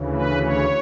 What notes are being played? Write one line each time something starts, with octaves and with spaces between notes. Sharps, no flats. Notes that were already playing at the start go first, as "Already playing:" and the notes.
Already playing: D2 C#3 E3
B4
C#5